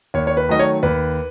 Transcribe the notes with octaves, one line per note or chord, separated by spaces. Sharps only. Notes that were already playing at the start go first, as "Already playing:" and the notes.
D#2 C#5
C#5
B4
D#3 F#3 A3 D#5
C#5
D#2 B4